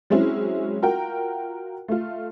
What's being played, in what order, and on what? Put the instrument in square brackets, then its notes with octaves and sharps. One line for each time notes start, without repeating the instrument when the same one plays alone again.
[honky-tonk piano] F#3 G#3 C4 C#4 E4
F4 F#4 A#4 G5
A3 F4